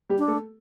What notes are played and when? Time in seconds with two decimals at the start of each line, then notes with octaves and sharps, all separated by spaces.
0.09 G3 G4
0.18 D4
0.28 A3 A4